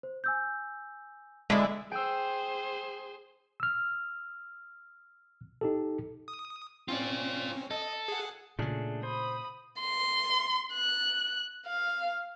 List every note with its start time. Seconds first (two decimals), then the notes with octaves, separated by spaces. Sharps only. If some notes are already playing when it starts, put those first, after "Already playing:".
0.03 C5
0.24 G#5 E6 G6
1.50 D3 G#3 E4 A5
1.92 G#4 C5 G5 E6
3.60 E6 F6
5.61 D#4 G4 A4
6.28 D#6
6.88 C4 C#4 F4 D5
7.71 A4 D#5
8.08 G#4 F#5
8.59 A#2 C#3 A3 D4 G#4
9.03 C5 B5 D#6
9.80 C6
10.73 F#6
11.66 F5